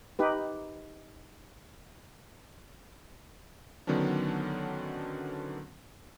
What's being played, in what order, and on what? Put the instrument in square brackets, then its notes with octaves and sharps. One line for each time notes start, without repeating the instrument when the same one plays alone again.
[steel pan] D#4 G4 B4
[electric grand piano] D3 D#3 F#3 B3 C#4 D4